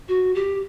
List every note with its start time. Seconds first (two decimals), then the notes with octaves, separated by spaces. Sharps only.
0.08 F#4
0.35 G4